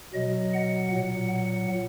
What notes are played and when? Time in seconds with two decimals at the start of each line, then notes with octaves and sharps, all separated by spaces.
0.14 B2 F#3 D#5
0.54 F#5
0.92 A#2 F#3 F#5
1.32 F#5